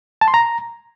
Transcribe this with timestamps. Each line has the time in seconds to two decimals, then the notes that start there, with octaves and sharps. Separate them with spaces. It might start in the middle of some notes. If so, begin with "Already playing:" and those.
0.21 A5
0.28 C6
0.34 A#5